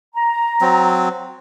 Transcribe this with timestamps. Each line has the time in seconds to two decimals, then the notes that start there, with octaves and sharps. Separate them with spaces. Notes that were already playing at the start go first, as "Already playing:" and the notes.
0.14 A#5
0.61 F#3 C4